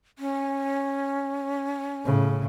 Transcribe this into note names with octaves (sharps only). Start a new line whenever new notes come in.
C#4
A2 C#3